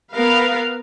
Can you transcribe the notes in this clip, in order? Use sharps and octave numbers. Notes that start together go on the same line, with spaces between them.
B3 A#4 B4 F5